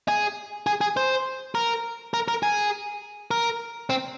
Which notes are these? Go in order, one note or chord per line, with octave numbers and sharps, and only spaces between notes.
G#4
G#4
G#4
C5
A#4
A#4
A#4
G#4
A#4
C4